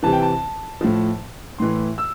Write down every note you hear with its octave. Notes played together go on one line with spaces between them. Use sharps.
C3 E3 A5
G5
A5
A2 F3
A2 E3 C6
E6